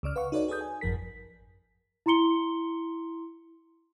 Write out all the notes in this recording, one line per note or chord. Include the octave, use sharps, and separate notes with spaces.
C#2 C#3 D5 F6
B4 F5 F#5 C#6
D#4 F#4 A4 B4 C#5 D5
G#4 A4 B4 D#6 G6
G#5
G#1 F#2 F3 A#4 B6
E4 A#5 C6 C#7 G7